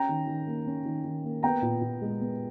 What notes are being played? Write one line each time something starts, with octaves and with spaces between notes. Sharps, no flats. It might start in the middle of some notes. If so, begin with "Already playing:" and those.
Already playing: C#4 G5 A#5
D#3
D#3
A#3
C#4
D#3
D#3
A#3
B3 G5 A#5
A#2
A#2
G#3
B3